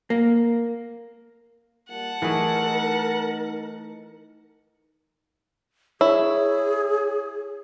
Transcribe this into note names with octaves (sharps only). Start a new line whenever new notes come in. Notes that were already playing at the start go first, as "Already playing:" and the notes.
A#3
G3 A#3 F4 F#5 A5
E3 A3 D#4 G#4 A#4
E4 G#4 C#5